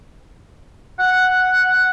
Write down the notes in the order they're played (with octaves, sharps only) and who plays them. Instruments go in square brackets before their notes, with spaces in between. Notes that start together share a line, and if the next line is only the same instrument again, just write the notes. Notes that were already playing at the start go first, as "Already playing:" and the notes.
[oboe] F#5